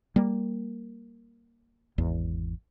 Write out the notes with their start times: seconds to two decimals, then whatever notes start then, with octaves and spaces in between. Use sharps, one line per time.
0.16 G3 A#3
1.98 G#1 E2